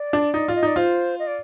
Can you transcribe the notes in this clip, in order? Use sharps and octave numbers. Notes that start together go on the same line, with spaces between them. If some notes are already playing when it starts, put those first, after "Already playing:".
Already playing: D5
D4
D#4
F4
D#5
D#4 D5
F4 C5
D#5
D5